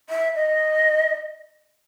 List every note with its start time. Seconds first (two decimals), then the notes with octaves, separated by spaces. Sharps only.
0.10 E5
0.36 D#5